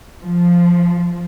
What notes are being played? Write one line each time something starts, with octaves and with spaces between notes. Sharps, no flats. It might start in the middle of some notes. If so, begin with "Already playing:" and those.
F3